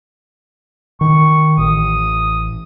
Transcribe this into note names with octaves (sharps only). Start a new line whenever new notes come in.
D#3 C#6
A1 D#6